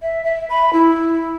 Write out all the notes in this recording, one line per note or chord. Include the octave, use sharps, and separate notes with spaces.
E5
E5
B5
E4